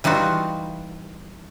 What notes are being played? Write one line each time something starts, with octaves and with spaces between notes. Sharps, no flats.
E3 G3 D#4 F4 F#4